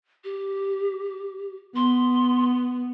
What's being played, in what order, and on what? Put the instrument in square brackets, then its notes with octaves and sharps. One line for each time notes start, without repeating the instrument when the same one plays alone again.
[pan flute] G4
[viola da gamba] B3 [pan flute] C6